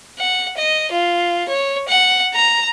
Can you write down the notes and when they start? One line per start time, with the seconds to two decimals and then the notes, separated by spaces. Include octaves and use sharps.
0.19 F#5
0.58 D#5
0.92 F4
1.49 C#5
1.88 F#5
2.34 A#5